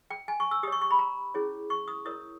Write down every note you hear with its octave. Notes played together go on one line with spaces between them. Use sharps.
G5
G#5
C#6
E6
G4 C#5 C#6 D#6
C#6
B5
A#5
C#4 E4 G#4 C#5
C#6
D#6
E4 A#4 C#5 D#6